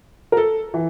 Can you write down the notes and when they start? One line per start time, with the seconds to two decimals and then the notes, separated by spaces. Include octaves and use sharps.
0.32 A#4
0.37 A4
0.74 E3